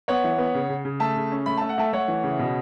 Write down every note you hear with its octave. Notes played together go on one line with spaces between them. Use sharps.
B3 C#5 F#5
E3
B3
C#3
C#3
C#3
A3 E5 A5
C#3
C#4
A3 B5
A3 A5
F#5
A3 E5 A5
A3 C#5 F#5
E3
C#3
B2